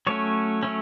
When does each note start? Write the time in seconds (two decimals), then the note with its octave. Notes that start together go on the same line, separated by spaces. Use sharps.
0.07 F#3 A3 C#4 C#5
0.63 F#3 A3 C#4